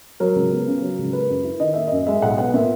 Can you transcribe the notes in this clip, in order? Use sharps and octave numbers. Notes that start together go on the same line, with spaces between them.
F#3 A#4
C#2
B3
C#3
F#3
C#2
A#3 B4
F#2
E4
D#3 D#5
A#3 E5
F#2 D#5
G#3 E5
B1 F#5
B3 F#5
A#2 E5